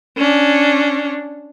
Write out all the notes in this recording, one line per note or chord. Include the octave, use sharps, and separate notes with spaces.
C#4 D4